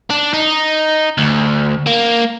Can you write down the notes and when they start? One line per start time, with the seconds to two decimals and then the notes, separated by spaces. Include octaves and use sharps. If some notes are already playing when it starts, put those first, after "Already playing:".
0.10 D4
0.33 D#4
1.18 D2
1.87 A#3